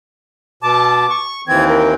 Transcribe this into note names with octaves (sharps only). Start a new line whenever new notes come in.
B2 A5 D6
C#6
D#2 E3 C4 G#6
A#4